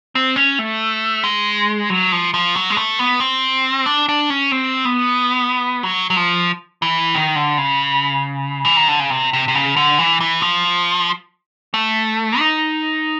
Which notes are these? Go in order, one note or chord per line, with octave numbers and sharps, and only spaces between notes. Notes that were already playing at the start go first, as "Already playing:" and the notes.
C4
C#4
A3
G#3
F#3
F3
F3
F#3
G#3
A3
B3
C4
D4
D4
C#4
C4
B3
F#3
F#3
F3
E3
D#3
D3
C#3
E3
D#3
D3
C#3
C3
C3
C3
C#3
D3
E3
E3
F3
A3
D#4